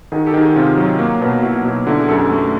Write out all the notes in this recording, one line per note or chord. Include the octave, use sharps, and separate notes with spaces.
D#3 F#4 G#4
G4 A4
D#3
F#4 G#4
C3 F4 G4
F#3
A#3
B2
B2 E4 F#4
B2
D3 E4 F#4
G#4
F#2 G4 A4
A3